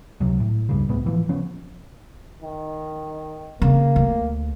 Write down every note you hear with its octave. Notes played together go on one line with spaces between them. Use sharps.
C#2 C3 F#3
A2
C#2 G2 C#3
C#2 A2 G#3 B3
A2 E3 F3
C#3 F3 B3 C#4
D#3
C#3 A#3
D2